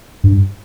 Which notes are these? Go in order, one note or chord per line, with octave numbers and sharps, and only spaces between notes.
G2